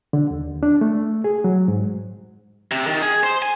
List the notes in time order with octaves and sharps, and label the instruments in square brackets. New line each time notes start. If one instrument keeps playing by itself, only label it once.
[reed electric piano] D3
D#2
D4
A3
G#4
F#3
G#2
[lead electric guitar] C3
D#3
G#4
C5
G#5